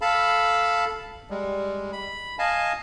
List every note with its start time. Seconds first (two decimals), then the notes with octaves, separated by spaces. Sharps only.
0.01 A4 F5 A5 B5
1.30 G3 G#3
1.92 B5
2.39 D#5 F5 G#5 A5